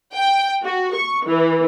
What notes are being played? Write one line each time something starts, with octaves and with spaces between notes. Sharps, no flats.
G5
F#4
C#6
E3